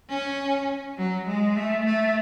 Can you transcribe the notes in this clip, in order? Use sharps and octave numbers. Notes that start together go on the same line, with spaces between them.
C#4
F#3
G#3
A3
A3